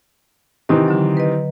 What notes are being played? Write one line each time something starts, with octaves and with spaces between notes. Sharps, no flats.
C3 D#3 E3 D#5
D3 F#3
B4 D#5